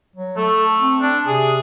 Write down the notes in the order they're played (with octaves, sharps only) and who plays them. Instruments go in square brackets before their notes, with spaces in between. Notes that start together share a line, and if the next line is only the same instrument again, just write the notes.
[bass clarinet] F#3
[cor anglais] A3 [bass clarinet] A4
[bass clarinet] C4
[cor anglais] D4
[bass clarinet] C3 [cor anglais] G#4